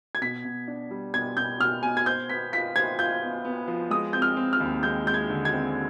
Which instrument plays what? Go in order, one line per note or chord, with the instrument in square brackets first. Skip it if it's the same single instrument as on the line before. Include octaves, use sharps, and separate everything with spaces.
[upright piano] G#6
[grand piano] B2 [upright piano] B6
[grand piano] B2
D4
G3
[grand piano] B2 [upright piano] G#6
[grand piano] B2 [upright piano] G6
[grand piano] B2 [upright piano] F6
[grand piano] B2 [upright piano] G#5
[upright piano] G#6
[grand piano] C5 [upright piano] G6
[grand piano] B3 [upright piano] B6
[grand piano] F4 [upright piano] B6
[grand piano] C5 [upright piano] G#6
[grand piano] F4 [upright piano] G6
[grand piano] B3
B3
F3
[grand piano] G#3 [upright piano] D#6
[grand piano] C4 [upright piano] G6
[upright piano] F6
[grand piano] C4
[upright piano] F6
[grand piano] D#2
[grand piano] G#3 [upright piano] G6
[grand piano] G#3 [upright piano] G6
[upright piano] G#6
[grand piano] D3
[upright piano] G#6
[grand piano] C4